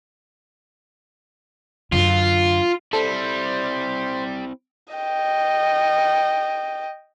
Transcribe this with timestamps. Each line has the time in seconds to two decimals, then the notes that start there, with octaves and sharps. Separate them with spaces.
1.92 F#2 D3 F4
2.93 G3 C4 E4 A4 C5
4.94 D#5 G5